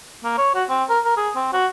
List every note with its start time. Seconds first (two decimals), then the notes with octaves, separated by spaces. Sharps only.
0.24 A#3
0.37 C#5
0.55 F#4
0.69 C4
0.89 A#4
1.05 A#4
1.17 G#4
1.35 C4
1.53 F#4